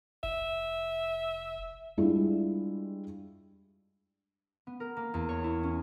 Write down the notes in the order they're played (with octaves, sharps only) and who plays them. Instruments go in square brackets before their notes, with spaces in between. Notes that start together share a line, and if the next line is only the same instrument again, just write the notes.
[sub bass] F1 [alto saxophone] E5
[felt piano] G3 G#3 D4 E4 F4
[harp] B3
A#4
A#3
E2
C#5
E4
C#4